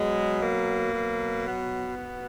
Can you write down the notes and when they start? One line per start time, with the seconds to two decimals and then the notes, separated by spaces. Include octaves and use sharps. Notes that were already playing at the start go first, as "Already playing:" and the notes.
Already playing: B2 F#3 G#3
0.40 A#3
0.93 B2 F#3
1.45 B3
1.98 B2